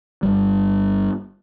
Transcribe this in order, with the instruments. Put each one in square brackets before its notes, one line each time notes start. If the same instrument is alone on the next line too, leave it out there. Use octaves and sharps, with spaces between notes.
[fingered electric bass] G1 C2 G3